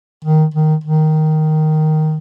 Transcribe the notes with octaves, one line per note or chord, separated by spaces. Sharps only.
D#3
D#3
D#3